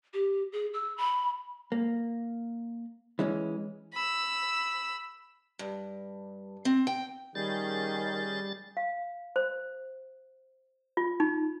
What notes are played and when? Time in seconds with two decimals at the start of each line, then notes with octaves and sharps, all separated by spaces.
0.14 G4
0.52 G#4
0.74 E6
0.97 B5
1.72 A#3
3.19 E3 G#3 C#4
3.93 B5 E6
5.59 G2
6.65 C4
6.87 G5
7.35 D#3 G3 C#4 G#4 G6 A6
8.77 F5
9.36 C5
10.97 F4
11.20 D#4